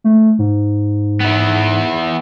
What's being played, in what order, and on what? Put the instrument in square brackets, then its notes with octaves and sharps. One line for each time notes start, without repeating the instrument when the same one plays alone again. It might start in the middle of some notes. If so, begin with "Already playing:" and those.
[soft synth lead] A3
G#2
[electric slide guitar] B3 E4